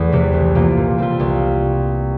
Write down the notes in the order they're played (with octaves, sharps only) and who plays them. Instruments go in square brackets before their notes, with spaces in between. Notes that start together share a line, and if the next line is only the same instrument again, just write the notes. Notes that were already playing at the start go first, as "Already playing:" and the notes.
Already playing: [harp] E2 A3
C3 E3 G3
C2
C3 G3 A#3 F4
A#2
G3 C4 F4
C2